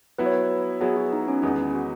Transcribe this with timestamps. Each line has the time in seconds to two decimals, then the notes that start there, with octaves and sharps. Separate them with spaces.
0.18 F#3 B3 E4 B4
0.26 C#5
0.34 B4
0.81 F#3 B3 E4 G#4
0.97 F#4
1.12 D#4
1.28 C#4
1.42 E2 D#3 G#3 B3 C#4 D#4
1.75 F#4